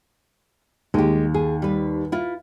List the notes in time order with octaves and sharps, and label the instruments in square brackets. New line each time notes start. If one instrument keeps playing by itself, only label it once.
[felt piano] D#2 [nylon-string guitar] G#3 G4
[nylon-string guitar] G#4
G3 B4
E4 F4